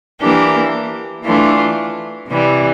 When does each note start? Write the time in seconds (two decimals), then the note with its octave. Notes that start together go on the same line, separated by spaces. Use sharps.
0.20 E3 A#3 D4 G4
1.24 E3 A3 D4 F4
2.28 C3 E3 G3